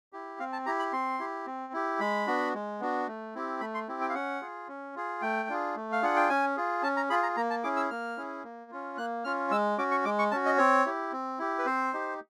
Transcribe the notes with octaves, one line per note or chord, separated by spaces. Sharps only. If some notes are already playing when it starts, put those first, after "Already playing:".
E4 G4
C4 F5
A5
E4 G4 A#5
B5
C4 C6
E4 G4
C4
E4 G4
G#3 B5
B3 D4 F#4
G#3
B3 D4 F#4
A3
C4 E4 G4
A3 B5
C6
C4 E4 G4
G5
F5
C#4 F#5
F4 G#4
C#4
F4 G#4
A3 G5
D4 F4 G#4
A3
F5
D4 F4 G#4 F#5
G5
C#4 G#5
F4 G#4
C#4 A5
A#5
F4 G#4 B5
A#5
A#3 A#5
A5
C#4 E4 G#4 D6
E6
A#3 F6
C#4 E4 G#4
A#3
C#4 F4
A#3 F#6
C#4 F4 F6
G#3 E6
C#4 F#4 D6
C#6
G#3 D6
C#6
C#4 F#4 A5
D#5
C4 C#5
E4 G4
C4
E4 G4
B4
C4 C5
D#4 G4